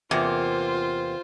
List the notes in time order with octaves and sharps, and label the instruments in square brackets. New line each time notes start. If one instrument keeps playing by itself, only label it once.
[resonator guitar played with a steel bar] E2 C3 A#3 [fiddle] F4 C5